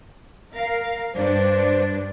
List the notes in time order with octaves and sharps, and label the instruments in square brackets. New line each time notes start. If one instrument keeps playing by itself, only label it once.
[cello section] A#4 F5
[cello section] G2 D4 [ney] C5